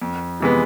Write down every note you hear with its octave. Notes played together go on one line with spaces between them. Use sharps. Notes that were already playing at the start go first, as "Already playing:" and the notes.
F2
C3 E3 G#3 B3